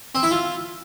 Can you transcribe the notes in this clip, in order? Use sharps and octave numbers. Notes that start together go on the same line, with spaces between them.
C4
E4
F4